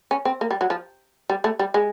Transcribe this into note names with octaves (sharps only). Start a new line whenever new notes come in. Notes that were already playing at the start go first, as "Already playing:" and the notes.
C#4
C4
A#3
G3
F#3
F3
G3
A3
G3
G#3